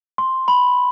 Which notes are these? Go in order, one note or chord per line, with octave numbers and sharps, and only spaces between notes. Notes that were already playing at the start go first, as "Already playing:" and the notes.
C6
B5